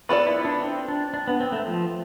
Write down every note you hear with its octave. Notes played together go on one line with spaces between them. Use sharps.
B3 F4 A4 B4 D5
E4
D4
C4
D4
D4
B3
C4
A3
F3